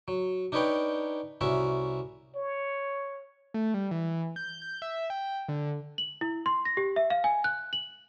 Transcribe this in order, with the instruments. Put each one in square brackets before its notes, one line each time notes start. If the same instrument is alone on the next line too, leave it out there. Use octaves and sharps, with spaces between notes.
[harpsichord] F#3
D4 D#4 A#4 B4 C#5 G5
C2 C#4 F#4 A#4 E5
[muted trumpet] C#5
[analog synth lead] A3
G3
E3
G6
G6
E5
G5
D3
[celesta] F#7
E4
C6
A#6
G4
E5
F5
G#5
F#6
F#7